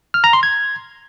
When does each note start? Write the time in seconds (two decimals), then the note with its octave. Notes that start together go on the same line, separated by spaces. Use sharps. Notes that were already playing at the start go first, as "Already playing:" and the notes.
0.14 F6
0.24 A#5
0.33 C6
0.43 G#6